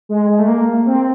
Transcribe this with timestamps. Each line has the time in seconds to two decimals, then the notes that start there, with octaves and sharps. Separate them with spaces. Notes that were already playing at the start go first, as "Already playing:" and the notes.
0.09 G#3
0.30 G#3
0.39 A3
0.48 A#3
0.86 C4